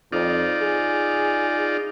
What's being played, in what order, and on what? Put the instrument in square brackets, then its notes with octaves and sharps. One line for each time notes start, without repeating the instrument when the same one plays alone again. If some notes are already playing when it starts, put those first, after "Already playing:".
[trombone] F2 [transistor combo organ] D#4 F4 D5
[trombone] G#4